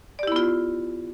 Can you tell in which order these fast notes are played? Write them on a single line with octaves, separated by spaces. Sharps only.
D5 G4 E4 B3 F4